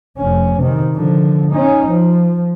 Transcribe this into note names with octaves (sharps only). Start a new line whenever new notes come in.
F1 C#4
C3 D#3
D3 F3
C#4 D#4
F3